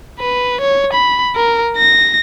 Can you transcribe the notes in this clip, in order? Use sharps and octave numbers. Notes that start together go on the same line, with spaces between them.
B4
C#5
B5
A#4
A#6